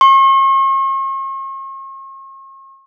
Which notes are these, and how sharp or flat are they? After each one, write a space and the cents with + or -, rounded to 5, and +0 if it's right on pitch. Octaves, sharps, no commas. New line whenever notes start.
C#6 -45